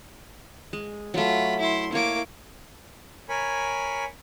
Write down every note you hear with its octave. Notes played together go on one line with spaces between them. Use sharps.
G#3
F#3 A3 F4 B5
E4 C6
A#3 E4 C#5 D6
A#4 C#5 G#5 B5